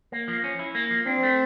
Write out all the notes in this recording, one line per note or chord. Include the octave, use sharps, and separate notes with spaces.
A#3
F3
C#4
E4
A#3
F3
C4 D4
A3